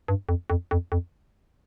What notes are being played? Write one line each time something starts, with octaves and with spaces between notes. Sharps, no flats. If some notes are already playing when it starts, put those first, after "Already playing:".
G2
F2
F2
F2
F2